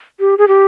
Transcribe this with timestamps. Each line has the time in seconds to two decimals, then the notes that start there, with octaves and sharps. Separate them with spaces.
0.20 G4
0.38 G#4
0.48 G4